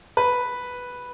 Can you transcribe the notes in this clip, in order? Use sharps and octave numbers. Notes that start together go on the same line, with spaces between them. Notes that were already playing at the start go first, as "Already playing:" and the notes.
B4